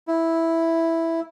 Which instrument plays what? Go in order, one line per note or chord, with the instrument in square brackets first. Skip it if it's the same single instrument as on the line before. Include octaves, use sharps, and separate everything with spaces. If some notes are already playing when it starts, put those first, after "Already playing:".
[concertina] E4